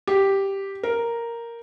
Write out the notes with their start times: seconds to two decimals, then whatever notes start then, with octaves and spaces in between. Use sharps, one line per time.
0.07 G4
0.83 A#4